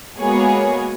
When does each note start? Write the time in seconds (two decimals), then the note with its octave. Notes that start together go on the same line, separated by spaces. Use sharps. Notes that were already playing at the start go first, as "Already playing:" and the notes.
0.18 G#3 A#3 B3 F#4 G#4 C#5